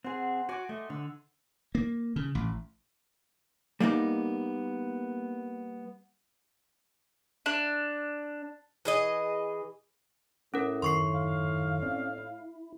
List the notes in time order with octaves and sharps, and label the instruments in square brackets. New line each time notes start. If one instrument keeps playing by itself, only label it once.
[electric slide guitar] C4 G#4 [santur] C5 F#5
[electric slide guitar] F#4 [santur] G#5 D6
[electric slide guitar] A3 [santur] D#5
[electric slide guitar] D3 [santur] E6
[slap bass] A#3
C#3
A1
[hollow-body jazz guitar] G3 A#3 B3 D#4
[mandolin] D4
[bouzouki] E3 G#4 D#5
[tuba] A2 [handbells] C#4 A#4
[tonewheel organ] F#2 D#3 [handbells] C6 C#6 C7
[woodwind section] F5
[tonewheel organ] C4 C#4 D5
E4